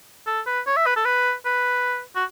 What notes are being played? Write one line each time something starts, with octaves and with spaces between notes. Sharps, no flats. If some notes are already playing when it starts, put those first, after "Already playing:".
A4
B4
C#5
E5
B4
A4
B4
B4
F#4